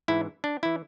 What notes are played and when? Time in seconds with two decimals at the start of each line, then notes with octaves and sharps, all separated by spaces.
0.08 G#2 E3 E4
0.44 D4
0.63 E3 E4